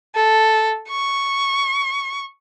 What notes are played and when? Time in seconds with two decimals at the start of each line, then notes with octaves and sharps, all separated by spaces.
0.15 A4
0.89 C#6